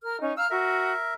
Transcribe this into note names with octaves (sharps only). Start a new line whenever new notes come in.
A#4 F6
C#4 D#4
F5 A#5 E6 F6
F#4 A#4 E5